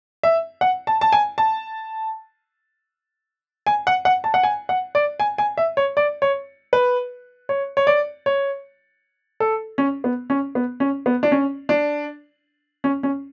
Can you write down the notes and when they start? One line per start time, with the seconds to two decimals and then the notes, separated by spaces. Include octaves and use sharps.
0.23 E5
0.61 F#5
0.87 A5
1.01 A5
1.12 G#5
1.38 A5
3.67 G#5
3.87 F#5
4.05 F#5
4.24 A5
4.34 F#5
4.43 G#5
4.69 F#5
4.95 D5
5.20 G#5
5.38 G#5
5.57 E5
5.77 C#5
5.97 D5
6.22 C#5
6.73 B4
7.49 C#5
7.77 C#5
7.87 D5
8.26 C#5
9.40 A4
9.78 C#4
10.04 B3
10.30 C#4
10.55 B3
10.80 C#4
11.06 B3
11.23 D4
11.32 C#4
11.69 D4
12.84 C#4
13.03 C#4